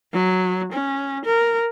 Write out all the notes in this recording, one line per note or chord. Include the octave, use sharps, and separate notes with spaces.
F#3
C#4
A#4